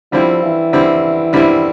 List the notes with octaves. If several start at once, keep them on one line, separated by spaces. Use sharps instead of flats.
D3 F3 G3 C4 E4
E3
D3 G3 C4 E4
D3 G3 C4 E4